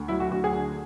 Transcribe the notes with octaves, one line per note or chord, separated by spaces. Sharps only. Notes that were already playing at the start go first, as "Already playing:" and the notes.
Already playing: D2
F#3 E4
F#4
D2 F#4
G#4
D3